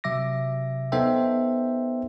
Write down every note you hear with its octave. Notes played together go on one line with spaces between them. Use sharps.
C3 F#3 E5 D6 A#6
B3 D#4 A4 C5 E5 G5